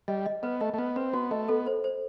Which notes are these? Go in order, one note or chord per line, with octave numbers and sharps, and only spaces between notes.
G3 D#5
D#5
B3 B4
A3 D#5
A3
B3 B4
C4 B4
B3 F#4
A3 D#5
B3 A4
C5
C5